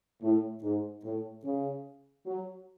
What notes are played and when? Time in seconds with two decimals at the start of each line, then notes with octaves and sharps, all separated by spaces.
0.22 A2
0.63 G#2
1.04 A2
1.44 C#3
2.26 F#3